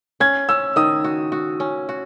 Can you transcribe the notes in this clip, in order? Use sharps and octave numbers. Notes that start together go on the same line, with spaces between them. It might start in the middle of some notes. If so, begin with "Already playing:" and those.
C#4 G#6
C#4 E6
D#3 D#6
F#4
F#4
C#4
F#4